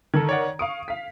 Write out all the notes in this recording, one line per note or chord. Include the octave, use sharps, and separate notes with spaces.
D#3 A4 G#6
C#5 D5 F#5
F5 C#6 D#6 D7
F5 B6